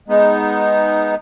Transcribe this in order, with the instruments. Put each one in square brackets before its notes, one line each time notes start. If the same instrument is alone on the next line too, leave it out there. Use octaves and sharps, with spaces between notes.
[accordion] G#3 B3 D#4